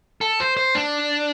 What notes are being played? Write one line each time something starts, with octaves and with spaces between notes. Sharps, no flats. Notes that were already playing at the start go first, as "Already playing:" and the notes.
A4
C5
C5
D4